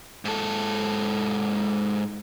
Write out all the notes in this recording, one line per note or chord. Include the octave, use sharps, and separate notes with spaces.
G#2 A4